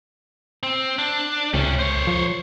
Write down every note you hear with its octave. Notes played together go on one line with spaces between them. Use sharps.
C4
D4
C#2 C3 C#4
C5 C#5
F3